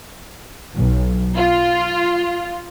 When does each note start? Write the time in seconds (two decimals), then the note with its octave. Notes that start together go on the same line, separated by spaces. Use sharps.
0.75 B1
1.36 F4